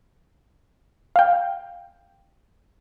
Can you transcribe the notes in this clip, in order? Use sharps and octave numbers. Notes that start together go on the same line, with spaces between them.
F5 G5